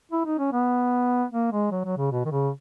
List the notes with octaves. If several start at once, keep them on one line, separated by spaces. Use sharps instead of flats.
E4
D#4
C#4
B3
A#3
G#3
F#3
F#3
C#3
B2
D#3
C#3